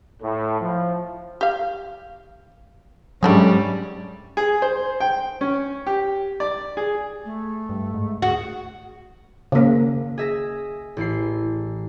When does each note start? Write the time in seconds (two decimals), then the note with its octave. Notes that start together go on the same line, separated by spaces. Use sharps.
0.22 A2
0.61 F3
1.41 G4 F5
3.23 G#2 F#3 G3 A3 C#4 D4 G#4
4.37 G#4
4.62 C5
5.00 G5
5.41 C#4
5.86 G4
6.40 D5
6.77 G#4
7.25 A3
7.69 G2
7.94 G#2
8.22 D2 F#4 G#4
9.52 C#3 A#3
10.18 G#4 E5 A#6
10.97 A1 E4 C7